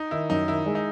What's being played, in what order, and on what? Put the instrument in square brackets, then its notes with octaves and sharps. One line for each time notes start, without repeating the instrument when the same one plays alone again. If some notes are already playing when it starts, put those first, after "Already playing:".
Already playing: [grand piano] D#4
[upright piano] D#3 [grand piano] E4
[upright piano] F#2 [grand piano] D#4
[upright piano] D#3 [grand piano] E4
[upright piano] G#3
[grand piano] D#4